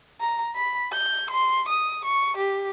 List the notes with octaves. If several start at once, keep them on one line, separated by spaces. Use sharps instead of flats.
A#5
B5
G6
C6
D#6
C#6
G4